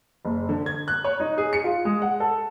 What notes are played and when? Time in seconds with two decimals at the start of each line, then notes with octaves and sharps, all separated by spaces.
0.25 F#1
0.49 D3
0.66 G#6
0.88 F#6
1.04 C#5
1.20 D#4
1.38 G#4
1.53 C#7
1.64 F4
1.85 G#3
2.02 F#5
2.20 A4